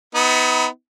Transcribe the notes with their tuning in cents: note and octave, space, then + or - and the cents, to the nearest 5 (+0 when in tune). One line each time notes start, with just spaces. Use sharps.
B3 +20 D#4 +40